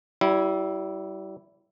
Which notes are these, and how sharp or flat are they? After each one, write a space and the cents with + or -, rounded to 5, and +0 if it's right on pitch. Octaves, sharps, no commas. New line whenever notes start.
G3 -35 E4 +0